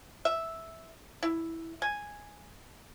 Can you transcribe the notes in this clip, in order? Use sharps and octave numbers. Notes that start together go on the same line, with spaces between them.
E5
E4
G#5